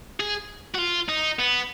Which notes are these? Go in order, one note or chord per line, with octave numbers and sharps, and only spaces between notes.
G#4
F#4
F4
D#4
B3